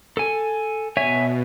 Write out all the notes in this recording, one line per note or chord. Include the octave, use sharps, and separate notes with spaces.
A4 G#5
B2 C#5 E5 G#5